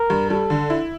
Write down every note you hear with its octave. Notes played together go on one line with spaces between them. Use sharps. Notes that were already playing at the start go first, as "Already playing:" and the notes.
Already playing: A#4
G2
G3 A4
D3
E4